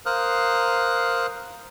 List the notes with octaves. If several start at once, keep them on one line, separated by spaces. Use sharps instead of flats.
A#4 C5 F5 D#6 F6 F#6